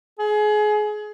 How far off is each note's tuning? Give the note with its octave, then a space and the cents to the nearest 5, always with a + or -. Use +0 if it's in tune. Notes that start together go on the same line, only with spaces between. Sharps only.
G#4 +25